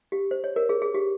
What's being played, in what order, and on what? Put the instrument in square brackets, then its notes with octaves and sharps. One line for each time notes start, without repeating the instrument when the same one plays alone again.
[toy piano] G4
C5
C#5
A#4
G#4
G#4
G4